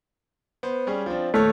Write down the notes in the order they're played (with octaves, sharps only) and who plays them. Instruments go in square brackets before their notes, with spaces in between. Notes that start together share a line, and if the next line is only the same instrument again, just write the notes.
[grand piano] B3 C5
G3 C#4 G#4
F3 C4 D4
[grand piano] D#1 C#5 F6 [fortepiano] A3